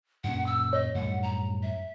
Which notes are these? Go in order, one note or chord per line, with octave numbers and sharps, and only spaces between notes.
F#2 A#2 C#4 F#5
E6
C#5 D#5
F#2 A2 G3 F#5
A#5
E5